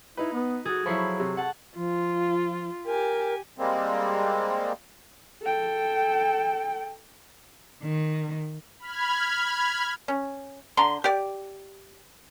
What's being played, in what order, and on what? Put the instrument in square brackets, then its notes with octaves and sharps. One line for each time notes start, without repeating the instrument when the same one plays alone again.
[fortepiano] D#4 B4 [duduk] E4
[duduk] B3
[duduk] F#4 [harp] G#4 A4
[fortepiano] F3 E4 [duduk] F#3 [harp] B5 C#6 C7
[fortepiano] C3
[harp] F#5 A5
[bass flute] F3 [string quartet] F4
[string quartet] G4 G#5 [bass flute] A#4
[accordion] G3 G#3 A#3 C4
[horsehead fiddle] A4 G5
[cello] D#3
[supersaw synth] B5 F6 G#6
[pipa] C#4
D3 A#5 C6
G4 D5